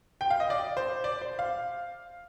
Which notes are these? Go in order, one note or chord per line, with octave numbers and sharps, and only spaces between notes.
G5
F5
D#5
D5
C5
D5
C5
F5